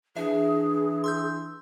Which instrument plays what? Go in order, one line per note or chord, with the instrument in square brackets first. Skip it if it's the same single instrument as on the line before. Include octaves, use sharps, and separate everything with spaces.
[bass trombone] E3 [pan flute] D4 [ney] G#4 [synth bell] E5
[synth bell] C6 E6 G6